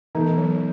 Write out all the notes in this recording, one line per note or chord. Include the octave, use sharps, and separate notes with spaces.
B2 E3 A3 D#4
F#3